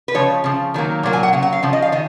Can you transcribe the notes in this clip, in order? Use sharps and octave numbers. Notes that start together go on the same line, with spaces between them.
B4
C#3 F3 G#3 C#5
C#3 F3
D#3 F#3 A#3
A#2 F#3 A#3
G#5
F#5
C#3 F#3
F#5
F5
C#3 F3
D#5
F5
D#3 D#5